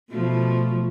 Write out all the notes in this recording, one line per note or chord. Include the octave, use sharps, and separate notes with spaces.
B2 F3 A3